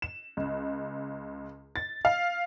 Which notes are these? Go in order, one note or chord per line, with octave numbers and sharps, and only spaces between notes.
E7
C#2
A6
F5